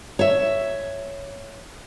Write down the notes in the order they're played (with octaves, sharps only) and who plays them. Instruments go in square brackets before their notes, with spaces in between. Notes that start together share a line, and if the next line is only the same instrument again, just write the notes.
[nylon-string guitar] C#5 E5